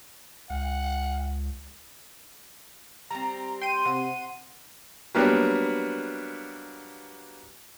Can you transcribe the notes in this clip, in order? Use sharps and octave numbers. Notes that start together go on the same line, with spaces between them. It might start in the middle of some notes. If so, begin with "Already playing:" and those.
C#2 F#5
G3 C4 A#5
G5 C6 D#7
C3 F#5
F#3 G3 A#3 B3 D4